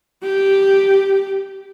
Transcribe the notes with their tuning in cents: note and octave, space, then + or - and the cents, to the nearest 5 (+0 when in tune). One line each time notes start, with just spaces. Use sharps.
G4 -5